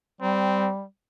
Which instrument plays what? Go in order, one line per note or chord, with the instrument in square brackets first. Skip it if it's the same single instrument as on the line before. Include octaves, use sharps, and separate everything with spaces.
[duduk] G3 [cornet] C4